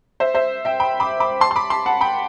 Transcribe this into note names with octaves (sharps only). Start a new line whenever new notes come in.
C5 E5
C5 E5
E5 G5
G5 B5
B5 D6
B5 D6
A5 C6
C6
B5 D6
A5 C6
F#5 A5
G5 B5